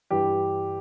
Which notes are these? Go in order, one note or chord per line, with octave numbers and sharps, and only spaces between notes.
G2 E3 G4